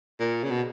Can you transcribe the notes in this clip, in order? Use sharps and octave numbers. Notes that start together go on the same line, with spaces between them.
A#2
C#3
B2